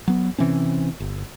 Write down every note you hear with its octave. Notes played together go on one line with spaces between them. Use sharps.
F#3 B3
C3 E3 C4 C#4
G1